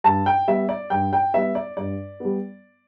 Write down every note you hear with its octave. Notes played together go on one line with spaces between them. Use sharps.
G2 A5
G5
G3 B3 E5
D5
G2 G5
G5
G3 B3 E5
D5
G2 D5
G3 B3